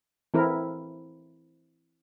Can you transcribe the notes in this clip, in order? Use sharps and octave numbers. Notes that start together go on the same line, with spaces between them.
E3 C4 E4 A4 A#4